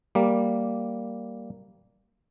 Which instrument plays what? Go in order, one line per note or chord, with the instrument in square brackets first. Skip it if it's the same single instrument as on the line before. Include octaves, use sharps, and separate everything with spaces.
[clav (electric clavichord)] G3 A#3